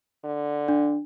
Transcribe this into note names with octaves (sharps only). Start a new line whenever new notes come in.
D3
D4